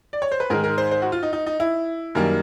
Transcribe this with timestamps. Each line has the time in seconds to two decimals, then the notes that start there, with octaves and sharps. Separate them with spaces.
0.13 D5
0.22 C#5
0.32 C5
0.40 B4
0.50 G#2 D#3 G#3 A#4
0.64 A#4
0.78 C5
0.91 C5
1.02 F#4
1.12 F4
1.23 D#4
1.33 D#4
1.46 D#4
1.60 E4
2.15 F#2 D#3 G3 A#3